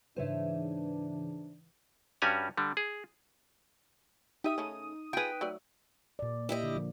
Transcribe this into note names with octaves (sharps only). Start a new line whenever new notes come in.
G#2 C#3 E3 D4 C5 C#5 E5
G2 G3 C#4 F#4 G#5 A#5
D3 G3
G#4
D#4 G4 E5 D#6 D#7
C#3 A3 C#4
F4 G#4 B4 G5
F#3 A3 D5
A#2 D5
E4 G4 D#5
D3
F3 A#3